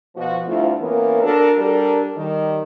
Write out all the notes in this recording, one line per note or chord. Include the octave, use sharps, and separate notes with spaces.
B2 F3 F#4
D2 G2 A3 C4 E4 F4
E3 A#3 B3 C#4 A#4
D4 F#4 A4 A#4
G3 D4 A4 A#4
D#3 G3